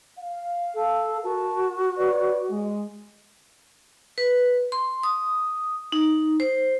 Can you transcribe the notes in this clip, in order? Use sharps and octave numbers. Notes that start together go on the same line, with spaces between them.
F5
A4
F#4 A#4 A5
B4 C#5 D5
G#3
B4
C6
D#6
D#4
C5